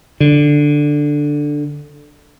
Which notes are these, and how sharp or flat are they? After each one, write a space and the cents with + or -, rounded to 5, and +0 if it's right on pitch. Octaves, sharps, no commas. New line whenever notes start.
D3 +5